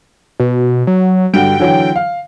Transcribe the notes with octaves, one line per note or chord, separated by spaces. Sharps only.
B2
F#3
G2 D3 F#4 G5
D3 E3 F#3
F5